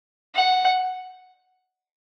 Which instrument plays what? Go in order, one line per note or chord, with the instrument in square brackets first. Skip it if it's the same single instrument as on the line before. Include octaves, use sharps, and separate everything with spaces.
[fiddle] F#5